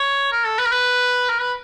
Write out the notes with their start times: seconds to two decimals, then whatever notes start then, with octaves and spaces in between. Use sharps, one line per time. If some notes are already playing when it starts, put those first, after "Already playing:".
Already playing: C#5
0.32 A#4
0.45 A4
0.59 B4
0.66 A#4
0.72 B4
1.30 A#4
1.41 B4